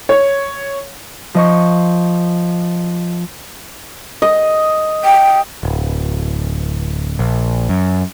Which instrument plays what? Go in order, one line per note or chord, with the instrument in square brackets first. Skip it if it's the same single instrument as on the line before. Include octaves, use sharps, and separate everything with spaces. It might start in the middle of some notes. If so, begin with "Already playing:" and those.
[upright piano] C#5
[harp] F3 D#5 C#6
[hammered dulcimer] D#5
[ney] G5
[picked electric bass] D1
A#1
F#2